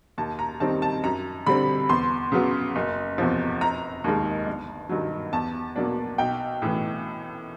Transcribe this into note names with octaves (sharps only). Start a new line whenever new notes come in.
D#2 A5
A#5
D#3 G3 C4 A5
A5
F#2 A#5
D3 G3 C4 B5
E2 C6
C#3 F#3 B3
F#1
E2 C3 F3
F1 A#5
D#2 D#3 G#3
G1
G2 D#3 F#3
E2 A5
B2 F#3 A#3 D4
B1 G5
A2 E3